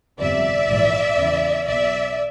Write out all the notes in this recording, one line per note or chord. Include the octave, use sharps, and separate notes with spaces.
G1 F2 C3 D5 E5
A#1 G#2 E3
E2 C#3 E3
B1 B2 D5 E5